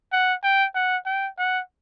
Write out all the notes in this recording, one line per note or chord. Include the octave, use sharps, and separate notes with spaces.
F#5
G5
F#5
G5
F#5